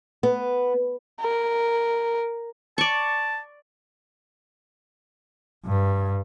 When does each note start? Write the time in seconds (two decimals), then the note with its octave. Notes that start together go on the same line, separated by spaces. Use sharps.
0.23 B3
1.21 A#4
2.78 D5 A5 C#6
5.65 G2